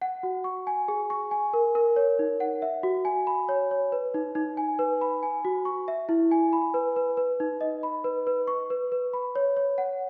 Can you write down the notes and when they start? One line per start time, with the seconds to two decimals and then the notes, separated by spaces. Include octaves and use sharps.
0.02 F#5
0.23 F#4
0.44 C#6
0.67 G#5
0.88 G#4
1.10 C#6
1.31 G#5
1.54 A#4
1.75 A#4
1.96 C#5
2.19 D#4
2.40 F#5
2.62 E5
2.83 F#4
3.05 G#5
3.27 B5
3.49 C#5
3.71 C#5
3.92 B4
4.14 D#4
4.35 D#4
4.57 G#5
4.79 B4
5.01 B5
5.23 G#5
5.45 F#4
5.65 C#6
5.88 E5
6.09 E4
6.31 G#5
6.53 B5
6.74 B4
6.96 B4
7.17 B4
7.40 D#4
7.61 D#5
7.83 B5
8.04 B4
8.27 B4
8.47 C#6
8.70 B4
8.92 B4
9.13 B5
9.35 C#5
9.57 C#5
9.78 F#5